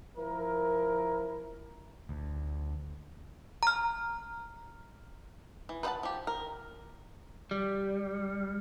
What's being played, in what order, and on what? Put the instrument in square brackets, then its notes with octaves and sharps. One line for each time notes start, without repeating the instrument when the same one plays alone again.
[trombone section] F3 E4 A#4
[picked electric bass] D2
[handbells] A#5 F6
[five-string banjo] E3
B4 C5 D#5 F#5 A5
F3 G4
A#4
[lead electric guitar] G3